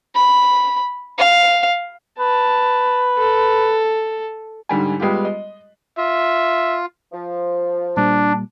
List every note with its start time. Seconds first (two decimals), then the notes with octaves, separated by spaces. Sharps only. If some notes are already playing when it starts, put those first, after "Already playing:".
0.15 B5
1.18 F5
2.19 B4 A5
3.18 A4
4.69 G#2 D3 G3 G#5
5.00 G3 G#3 B3 F4 G4
5.25 D#5
5.97 F4 E5
7.13 F3
7.97 A#2 G3 D4